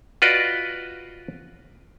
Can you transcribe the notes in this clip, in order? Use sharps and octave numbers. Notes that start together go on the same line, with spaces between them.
F4 F#4 B4 D5 D#5